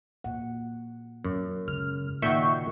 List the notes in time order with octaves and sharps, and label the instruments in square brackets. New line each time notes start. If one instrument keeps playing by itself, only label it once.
[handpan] A#2 F#5
[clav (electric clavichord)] F#2
[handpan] C#3 [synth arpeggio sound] F6
[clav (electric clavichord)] A#2 D#3 F#4 [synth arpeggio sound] E5 C#6 G6